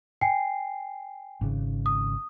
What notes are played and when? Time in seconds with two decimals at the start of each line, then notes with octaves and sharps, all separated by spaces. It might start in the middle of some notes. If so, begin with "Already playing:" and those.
0.21 G5 G#5 C7
1.41 G#1 C#3
1.86 D#6